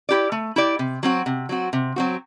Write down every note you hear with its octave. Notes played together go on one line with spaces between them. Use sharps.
E4 G4 D5
A3
E4 G4 D5
C3
F#3 C4 F#4
C3
F#3 C4 F#4
C3
F#3 C4 F#4